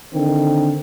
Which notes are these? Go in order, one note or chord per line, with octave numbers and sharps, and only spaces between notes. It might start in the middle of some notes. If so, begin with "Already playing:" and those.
D3 D#3 C4